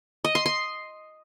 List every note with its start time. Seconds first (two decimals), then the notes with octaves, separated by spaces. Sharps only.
0.25 D#5
0.35 C6
0.46 C6